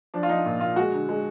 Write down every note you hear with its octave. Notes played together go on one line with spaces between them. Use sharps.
F3 D4
F4
F3 D#4
A#2
A#2 F4
G#3 F#4
D3
G#3